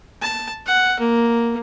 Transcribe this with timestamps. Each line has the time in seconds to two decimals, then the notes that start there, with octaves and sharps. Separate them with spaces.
0.21 A5
0.66 F#5
1.00 A#3